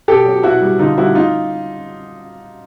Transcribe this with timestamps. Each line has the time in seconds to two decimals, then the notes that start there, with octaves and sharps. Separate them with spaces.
0.08 B2 G4 A4
0.26 F#3
0.43 B2 E4 F#4
0.62 G3
0.79 D3 D#4 F4
0.98 G3 E4 F#4
1.15 D#4 F4